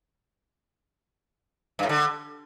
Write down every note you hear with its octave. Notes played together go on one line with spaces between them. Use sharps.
G2
A2
D3